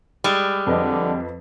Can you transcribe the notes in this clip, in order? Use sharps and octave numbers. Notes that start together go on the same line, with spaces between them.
G3 G#3 B5
F2 D3 B4 D#5